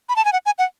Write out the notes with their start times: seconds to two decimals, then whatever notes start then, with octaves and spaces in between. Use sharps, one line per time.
0.09 B5
0.16 A5
0.25 G#5
0.33 F#5
0.46 G#5
0.58 F#5